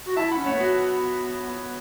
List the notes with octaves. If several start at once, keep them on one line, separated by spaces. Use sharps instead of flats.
F#4
E4 E5 A5
C#4 F#5 B5
A3 C#5 F#5
B3 F#4